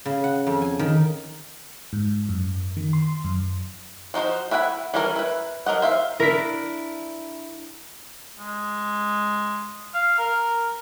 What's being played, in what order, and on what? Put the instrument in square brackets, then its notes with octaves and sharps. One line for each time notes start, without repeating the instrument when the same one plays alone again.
[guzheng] C#3
F#5
F2
G#5
D#3
[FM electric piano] G#2
F#2
D#3
C6
F#2
[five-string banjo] F3 D#4 F#4 C5
E4 E5 F#5 G5 B5
E3 G3 C#4 E4 A#4
E4 B4
F#3 A#4 D#5 F#5
C5 E5 F5
[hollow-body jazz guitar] D4 E4 [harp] A#4 B6
[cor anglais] G#3
F5
A#4